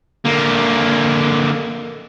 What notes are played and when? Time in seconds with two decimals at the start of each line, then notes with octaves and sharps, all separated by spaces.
0.25 D3 A#3